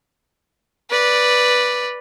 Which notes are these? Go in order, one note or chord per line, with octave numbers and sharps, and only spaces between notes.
B4 D5